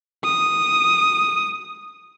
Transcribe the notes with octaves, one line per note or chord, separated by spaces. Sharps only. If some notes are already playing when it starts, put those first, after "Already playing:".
D#6